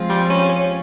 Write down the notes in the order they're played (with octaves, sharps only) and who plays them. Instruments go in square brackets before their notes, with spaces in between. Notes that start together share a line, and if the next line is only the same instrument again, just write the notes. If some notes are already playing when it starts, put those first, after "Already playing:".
Already playing: [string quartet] F3 G#3 C4 F4
[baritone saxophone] G3
C#4
C#4